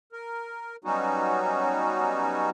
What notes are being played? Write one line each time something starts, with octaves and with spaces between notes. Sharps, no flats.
A#4
F#3 G3 B3 C#4 D#4 F#4